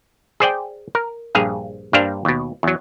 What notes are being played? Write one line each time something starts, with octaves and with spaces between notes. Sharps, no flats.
G#4 C5 D5 G5
A#4
A#1 G2 G#4 F5
G2 G3 A#3 D4 C5 F5
D#2 B2
E2 F#3